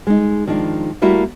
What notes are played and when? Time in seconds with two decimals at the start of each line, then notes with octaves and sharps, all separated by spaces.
0.07 G#3 D#4
0.47 D#3 F3 G#3 D4
1.02 G3 A3 A#3 E4 F#4